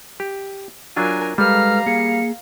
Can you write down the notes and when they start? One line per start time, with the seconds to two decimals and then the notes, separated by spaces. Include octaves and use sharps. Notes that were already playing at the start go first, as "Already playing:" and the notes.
0.20 G4
0.96 F#3 D4 F4 A#4 G#5
1.38 G3 G#3 A4 B4 F5 A#5 F6
1.86 A#3 G#4 C#7